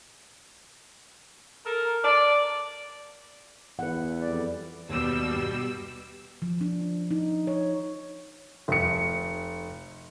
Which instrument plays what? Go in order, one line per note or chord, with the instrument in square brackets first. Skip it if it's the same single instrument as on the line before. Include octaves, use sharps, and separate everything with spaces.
[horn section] A4 A#4
D5
[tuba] E2 [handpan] B4 F#5
[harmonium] F2 G3 D5
[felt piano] D#2 [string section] B2 G3 E6
[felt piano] G2
[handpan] F3
D4
D#4
C#5
[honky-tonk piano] F1 C#7